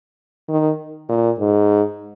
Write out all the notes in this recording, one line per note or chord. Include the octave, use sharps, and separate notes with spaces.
D#3
A#2
G#2